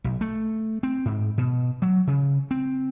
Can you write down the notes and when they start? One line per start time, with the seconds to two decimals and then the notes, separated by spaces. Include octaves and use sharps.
0.04 B1
0.21 A3
0.83 C4
1.05 G#2
1.38 B2
1.82 F#3
2.07 C#3
2.51 C4